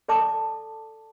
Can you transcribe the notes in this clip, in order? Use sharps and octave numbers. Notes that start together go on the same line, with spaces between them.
A4 D5 A5 D6